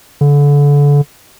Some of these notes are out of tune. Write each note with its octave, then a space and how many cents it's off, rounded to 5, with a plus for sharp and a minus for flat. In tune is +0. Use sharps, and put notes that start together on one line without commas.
D3 -30